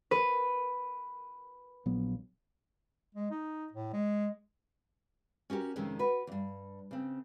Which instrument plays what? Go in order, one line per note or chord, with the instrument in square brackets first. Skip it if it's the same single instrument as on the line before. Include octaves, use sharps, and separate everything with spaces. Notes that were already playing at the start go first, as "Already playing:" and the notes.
[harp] B4
[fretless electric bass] A#1 F#3 B3
[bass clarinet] G#3
D#4
A2
G#3
[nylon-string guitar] C#4 F#4 G4 A#4
F2 C3 D#3 G#3 C#4
F#4 B4
E2 G2
C#3 C4